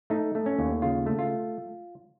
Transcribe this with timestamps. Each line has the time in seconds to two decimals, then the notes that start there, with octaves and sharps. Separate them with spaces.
0.10 A3 D#4
0.35 A3
0.46 C#4
0.59 D#2
0.82 C#3 F4
1.06 A3
1.19 F4